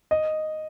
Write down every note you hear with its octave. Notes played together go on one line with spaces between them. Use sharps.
D#5